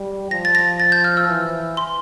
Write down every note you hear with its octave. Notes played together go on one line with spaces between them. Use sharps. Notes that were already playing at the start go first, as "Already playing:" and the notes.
Already playing: G3
F3 A#6
A6
A#6
A6
G6
F6
E6
E3
C6